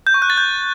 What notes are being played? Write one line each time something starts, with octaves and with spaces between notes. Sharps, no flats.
G6
C#6
F#6
A6
G6